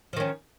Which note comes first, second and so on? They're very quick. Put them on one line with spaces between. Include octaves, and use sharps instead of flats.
F3 D#3 C#4